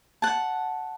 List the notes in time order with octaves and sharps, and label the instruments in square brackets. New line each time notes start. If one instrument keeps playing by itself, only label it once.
[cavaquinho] F#5 A5